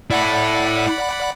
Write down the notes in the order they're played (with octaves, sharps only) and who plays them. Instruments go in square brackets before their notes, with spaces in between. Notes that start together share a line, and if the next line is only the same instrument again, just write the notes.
[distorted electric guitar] E4 A4 [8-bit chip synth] D5 F#5 B5